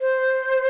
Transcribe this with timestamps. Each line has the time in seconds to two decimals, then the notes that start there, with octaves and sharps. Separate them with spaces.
0.01 C5